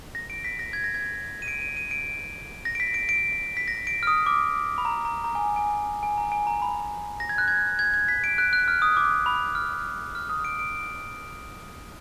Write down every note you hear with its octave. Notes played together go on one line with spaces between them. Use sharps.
A#6
D7
B6
A#6
G#6
A#6
G#6
D#7
D7
D#7
D#7
D7
A#6
D7
B6
D7
D7
B6
A#6
D7
F6
D#6
D6
B5
A#5
A#5
A#5
G#5
G#5
G#5
A#5
G#5
A#5
B5
A#6
G#6
F#6
G#6
G#6
G#6
B6
D7
F#6
F#6
F6
D#6
D6
B5
F6
F6
D#6
D7
D7